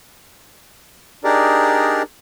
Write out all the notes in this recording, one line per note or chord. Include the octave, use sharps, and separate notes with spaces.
D4 D#4 G4 G#4 A#4 D5